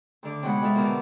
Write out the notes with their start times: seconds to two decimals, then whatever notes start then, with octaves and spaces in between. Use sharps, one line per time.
0.23 D2 D3 D6
0.43 C3 F#3 G#3 B3 F#5 B5
0.62 G#3 F4 A4 E5
0.75 E2 B2 D3 F4 A#4 D6